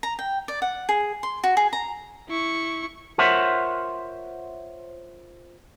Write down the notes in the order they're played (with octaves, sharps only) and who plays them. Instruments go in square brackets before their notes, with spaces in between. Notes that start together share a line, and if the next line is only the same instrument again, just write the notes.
[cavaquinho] A#5
G5
D5
F#5
G#4
C6
F#4
G#4
A#5
[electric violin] E4 C#6
[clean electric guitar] F4 A#4 C5 C#5 E5 F#5